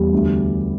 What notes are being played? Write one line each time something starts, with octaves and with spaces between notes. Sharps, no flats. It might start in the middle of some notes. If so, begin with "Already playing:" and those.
Already playing: E2 G3
D2